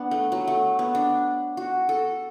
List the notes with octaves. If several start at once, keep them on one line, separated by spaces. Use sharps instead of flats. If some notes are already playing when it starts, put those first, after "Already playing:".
Already playing: B3 D4
A3
F#3
A3
B3
D4
F#4
A4